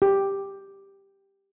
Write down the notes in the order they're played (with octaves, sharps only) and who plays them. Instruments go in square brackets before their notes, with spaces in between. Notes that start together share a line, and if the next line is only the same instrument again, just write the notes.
[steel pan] G4